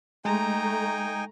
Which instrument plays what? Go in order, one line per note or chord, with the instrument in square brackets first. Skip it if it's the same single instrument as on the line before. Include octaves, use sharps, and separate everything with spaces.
[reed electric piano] G#3 [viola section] A3 [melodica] D#4 G5 G#5 [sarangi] A#5